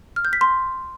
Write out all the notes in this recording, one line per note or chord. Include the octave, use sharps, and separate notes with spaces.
F6
G6
B6
C6